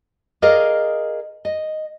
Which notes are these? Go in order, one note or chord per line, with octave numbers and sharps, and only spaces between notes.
G#4 A#4 D5 D#5 F5
D#5